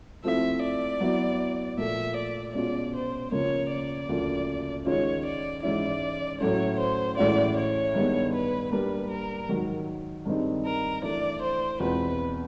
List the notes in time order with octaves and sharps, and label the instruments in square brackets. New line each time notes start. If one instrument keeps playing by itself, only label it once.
[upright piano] F3 A3 C4 E4 [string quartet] E5
[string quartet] D5
[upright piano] F#3 B3 E4
[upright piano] A#2 F3 A3 [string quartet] E5
[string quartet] D5
[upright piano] B2 G#3 C#4 F4 [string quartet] D5
[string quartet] C5
[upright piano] C#2 C#3 F3 A#3 [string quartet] C#5
[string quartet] D5
[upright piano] D2 C#3 F3 A#3
[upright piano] D#3 G#3 C#4 F4 [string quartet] C#5
[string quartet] D5
[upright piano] G#2 E3 G#3 C#4 E4 [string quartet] D5
[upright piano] A2 F#3 A3 C#4 [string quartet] C#5
[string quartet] C5
[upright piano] A2 E3 G#3 C#4 F#4 [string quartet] D5
[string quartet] C#5
[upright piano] G2 D#3 G#3 B3
[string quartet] B4
[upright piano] G3 A#3 D4 [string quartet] B4
[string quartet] A#4
[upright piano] G#2 D#3 F#3
G2 D#3 G#3 C4 D#4
[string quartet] A#4
[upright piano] E3 A3 D4 [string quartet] D5
[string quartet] C5
[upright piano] E2 B2 G#3 C4 F4 [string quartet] B4